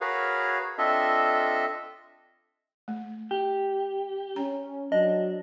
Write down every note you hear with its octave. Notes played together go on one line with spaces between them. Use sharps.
F#4 G#4 A#4 B4 C#5 F5
C4 D4 F4 A4 D#5 E5
A3
G4
C#4 A#5
F#3 D4 D#5